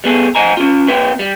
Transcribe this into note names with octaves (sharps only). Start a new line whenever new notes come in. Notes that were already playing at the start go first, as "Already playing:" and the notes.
G3 B3 G#4 A4
F2 C5 D#5 G#5 A#5
C#4 F4
A#2 C4 B4 G5
G3